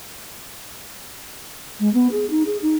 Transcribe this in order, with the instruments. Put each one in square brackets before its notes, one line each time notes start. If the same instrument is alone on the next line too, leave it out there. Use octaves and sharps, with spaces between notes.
[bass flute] G#3
B3
G#4
D#4
G#4
D#4